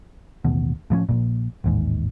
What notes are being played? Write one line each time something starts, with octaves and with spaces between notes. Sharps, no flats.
A1 D#2 B2
A2 F3 B3 C#4
A#1 F2 A#2
A1 D#2 G#2